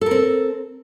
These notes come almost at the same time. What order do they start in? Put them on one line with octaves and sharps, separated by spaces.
A4 A#4 C4